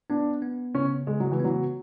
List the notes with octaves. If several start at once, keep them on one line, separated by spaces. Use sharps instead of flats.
B3 D4
B3
C#3 C#4
C#3 G#3
F#3
E3
F#3 B3